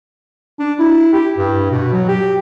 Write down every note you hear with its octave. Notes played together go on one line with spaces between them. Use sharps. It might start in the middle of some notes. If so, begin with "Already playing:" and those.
D4
E4
G4
G2
B2
F#3
G4